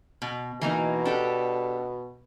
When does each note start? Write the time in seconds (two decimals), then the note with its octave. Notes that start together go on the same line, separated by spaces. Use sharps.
0.22 B2
0.61 B2 E3 A#3 D#4
1.05 D4 G4 A4